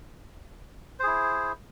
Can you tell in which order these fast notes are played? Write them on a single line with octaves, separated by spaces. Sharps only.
C5 G#4 E4